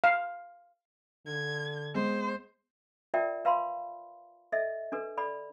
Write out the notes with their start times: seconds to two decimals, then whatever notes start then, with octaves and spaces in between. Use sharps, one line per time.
0.04 F5
1.27 D3 G#6
1.95 G#3 B3 C5
3.14 F4 A#4 D5 E5 G5 A5
3.45 B4 F5 A5 B5 C6
4.52 A4 D#5 E5
4.92 D4 A4 B4
5.18 A4 D5 B5